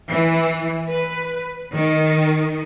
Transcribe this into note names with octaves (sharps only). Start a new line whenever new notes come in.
E3
B4
D#3